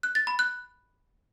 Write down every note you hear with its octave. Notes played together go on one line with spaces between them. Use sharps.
F#6
A6
B5
F#6